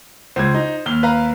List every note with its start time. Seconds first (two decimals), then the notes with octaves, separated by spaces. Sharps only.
0.36 C#2 C5 G#6
0.54 D#4
0.86 D#2 F6 G7
1.03 B4 F5 A#5